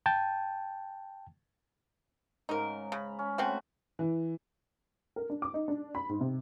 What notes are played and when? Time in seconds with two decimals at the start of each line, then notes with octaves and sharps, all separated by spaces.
0.06 G5 A5
2.49 G#2 C#3 D#4 A#4
2.92 C#3 A#5 B5
3.19 C#4
3.38 A3 C4 C#4 F#4 B4
3.99 E3
5.16 A#4
5.30 D4
5.42 D6
5.54 D#4
5.68 D4
5.95 B5
6.09 G#2
6.21 C3